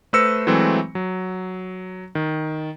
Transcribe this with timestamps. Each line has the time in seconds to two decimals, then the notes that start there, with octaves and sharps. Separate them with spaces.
0.13 A3 B4 C5 E6 A#6 C#7
0.47 E3 F#3 G#3 A3 C4
0.95 F#3
2.15 D#3